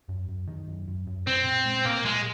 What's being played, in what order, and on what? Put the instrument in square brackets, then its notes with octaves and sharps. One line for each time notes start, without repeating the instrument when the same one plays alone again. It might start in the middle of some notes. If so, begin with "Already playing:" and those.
[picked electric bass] F#2
F#2
D#3
F#2
F#2
F#2
[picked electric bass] A#2 [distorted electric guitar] C4
[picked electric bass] A#2
G#3
[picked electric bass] A#2 [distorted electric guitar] A#3
[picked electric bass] A#2 [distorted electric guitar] G#3